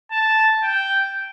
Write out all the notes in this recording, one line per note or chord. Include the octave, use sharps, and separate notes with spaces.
A5
G5